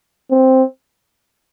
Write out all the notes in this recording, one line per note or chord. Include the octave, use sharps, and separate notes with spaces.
C4